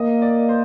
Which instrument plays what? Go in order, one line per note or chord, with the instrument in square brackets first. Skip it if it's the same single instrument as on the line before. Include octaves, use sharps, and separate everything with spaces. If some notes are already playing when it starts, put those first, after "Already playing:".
Already playing: [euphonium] A#3 [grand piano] D#5
[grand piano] D5
C5